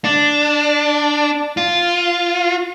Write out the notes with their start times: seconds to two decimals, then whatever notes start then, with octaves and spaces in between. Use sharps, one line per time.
0.05 D4
1.57 F4